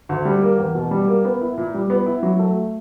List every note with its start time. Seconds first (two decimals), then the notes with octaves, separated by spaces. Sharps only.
0.09 D2
0.25 G3
0.42 A#3
0.58 E2
0.75 B2
0.91 G3
1.08 A#3
1.25 B3
1.41 E4
1.58 A#2
1.74 G3
1.90 B3
2.06 E4
2.23 F#3
2.39 A3